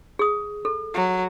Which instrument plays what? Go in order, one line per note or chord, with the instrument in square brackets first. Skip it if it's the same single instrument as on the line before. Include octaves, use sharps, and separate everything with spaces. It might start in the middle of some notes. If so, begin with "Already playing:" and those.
[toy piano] G#4 D#6
A4
[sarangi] F#3